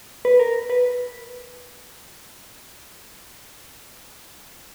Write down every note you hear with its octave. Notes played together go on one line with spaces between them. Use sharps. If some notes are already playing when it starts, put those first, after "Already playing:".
B4
A#4
B4